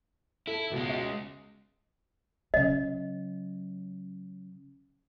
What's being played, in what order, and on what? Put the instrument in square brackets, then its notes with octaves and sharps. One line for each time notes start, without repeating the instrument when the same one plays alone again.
[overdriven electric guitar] E4 [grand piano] A4
[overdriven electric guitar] C#2 G#3 [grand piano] B2
[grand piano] D#5
[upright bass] C#3 F#3 [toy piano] D#5